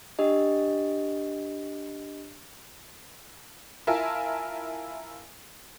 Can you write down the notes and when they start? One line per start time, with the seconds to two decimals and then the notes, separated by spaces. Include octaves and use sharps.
0.19 D4 G4 D#5
3.87 E4 F4 A#4 E5 G#5 A5